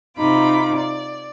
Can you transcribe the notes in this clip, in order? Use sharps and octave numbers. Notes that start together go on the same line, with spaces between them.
C3 D#4 F4 B5 D6
D5